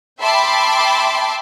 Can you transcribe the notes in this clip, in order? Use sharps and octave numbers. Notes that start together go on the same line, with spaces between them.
E5 G5 A5 B5 C6 D6